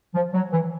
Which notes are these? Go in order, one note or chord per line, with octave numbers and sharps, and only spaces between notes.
F3
F#3
E3